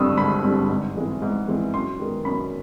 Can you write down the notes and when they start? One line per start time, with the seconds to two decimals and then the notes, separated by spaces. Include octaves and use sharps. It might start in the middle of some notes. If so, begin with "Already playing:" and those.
Already playing: G#1 G2 D3 G3 C4 D#6 E6
0.17 G#1 B5
0.43 G2 D3 G3 C4
0.69 G#2
0.95 E3 G#3 C4 E4
1.22 G#2
1.47 E3 G#3 C4 E4
1.74 F#2 C6
1.99 D#3 G#3 B3
2.25 F#2 B5